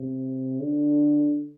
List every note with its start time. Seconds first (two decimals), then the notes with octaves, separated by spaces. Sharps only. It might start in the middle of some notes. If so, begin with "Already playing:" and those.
Already playing: C3
0.61 D3